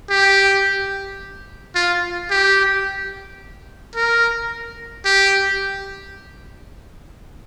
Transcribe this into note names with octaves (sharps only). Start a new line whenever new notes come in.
G4
F4
G4
A#4
G4